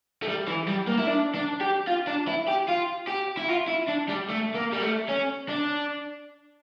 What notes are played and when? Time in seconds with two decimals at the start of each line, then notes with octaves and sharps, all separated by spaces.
0.23 A3
0.28 G3
0.48 E3
0.68 G3
0.88 A#3
0.98 E4
1.07 D4
1.34 D4
1.61 G4
1.88 F4
2.07 D4
2.28 E4
2.48 G4
2.68 F4
3.07 G4
3.37 E4
3.48 F4
3.67 E4
3.88 D4
4.09 G3
4.29 A3
4.54 A#3
4.72 G3
4.82 A3
5.08 C#4
5.49 D4